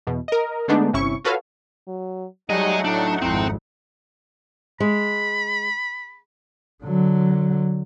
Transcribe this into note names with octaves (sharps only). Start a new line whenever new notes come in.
E2 B2
A#4 D#5
D3 G#3 A3 B3 D4 D#4
G1 C3 C#4 E4 C#6
F4 F#4 A4 B4 C#5 F5
F#3
F#3 G3 A3 D#4 G#4 D#5 F#5
A2 D4
G#1 F2 C4 E4
G#3 B5
D3 F#3